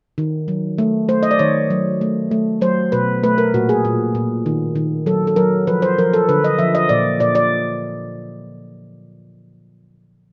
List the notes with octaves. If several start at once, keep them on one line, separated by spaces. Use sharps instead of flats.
D#3
F#3
A3
A3 C5
D#5
D5
D#3 C#5
F#3
A3
A3
F#3 C5
B2 B4
A3 B4
A#4
A#2 F#4
G#4
A#2
A#2
D#3
D#3
F#3 A4
A4
F#3 A#4
F3 B4
C5
F3 A#4
A4
D3 B4
D#5
F3 E5
D#5
A#2 D5
A#2 D5
D5